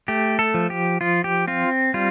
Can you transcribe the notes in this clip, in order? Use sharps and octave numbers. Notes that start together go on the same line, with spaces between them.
A3 G4
A4
F3
G4
F3 F4
G4
C4 F4
G3 F4